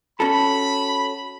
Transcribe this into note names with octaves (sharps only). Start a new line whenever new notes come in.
C#4 F#4 A4 B5